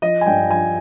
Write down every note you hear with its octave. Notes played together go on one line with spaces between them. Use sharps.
F3 D#5
G#5
G2 G5
F3 G#5